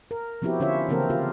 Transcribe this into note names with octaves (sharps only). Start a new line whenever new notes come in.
A#4
F3 B3 C4 E4 F#4 G4
D3 C#4 E4 F4 C#5 E5
C#3 E3 A#3 C4 A4 A#4
B3 F4 G4